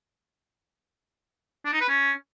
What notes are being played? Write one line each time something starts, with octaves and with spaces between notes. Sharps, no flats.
D4
D#4
B4
C#4